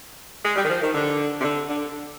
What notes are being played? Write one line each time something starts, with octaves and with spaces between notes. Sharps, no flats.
G#3
G3
D#3
F3
D#3
D3
C3
D3
D3